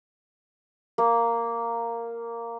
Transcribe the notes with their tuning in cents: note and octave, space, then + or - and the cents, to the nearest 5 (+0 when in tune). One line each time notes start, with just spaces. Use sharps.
A#3 -5